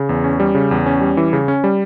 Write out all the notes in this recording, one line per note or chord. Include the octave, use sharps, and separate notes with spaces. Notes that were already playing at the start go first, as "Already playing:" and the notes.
Already playing: C#3
E2
C#4
G3
C#3
E2
C#4
G3
E3
C#3
C#4
G3